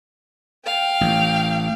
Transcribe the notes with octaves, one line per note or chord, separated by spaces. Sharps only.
F5 G5
A1